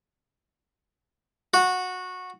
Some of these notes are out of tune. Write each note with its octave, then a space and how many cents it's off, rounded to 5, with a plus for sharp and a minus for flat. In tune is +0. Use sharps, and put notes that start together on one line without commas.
F#4 -15